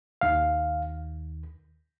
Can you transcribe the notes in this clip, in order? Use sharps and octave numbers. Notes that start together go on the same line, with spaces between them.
D#2 D#3 F5